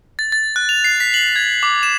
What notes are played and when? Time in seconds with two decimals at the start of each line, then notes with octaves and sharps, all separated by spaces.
0.19 A6
0.32 A6
0.56 F#6
0.69 F7
0.84 C7
1.00 B6
1.14 F#7
1.36 G#6
1.63 D6
1.83 E7